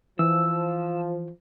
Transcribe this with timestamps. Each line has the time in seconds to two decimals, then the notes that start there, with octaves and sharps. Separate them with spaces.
0.19 E3 F3 E6